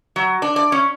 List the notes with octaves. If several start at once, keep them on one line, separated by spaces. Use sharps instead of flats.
F#3
D4
D5
C#4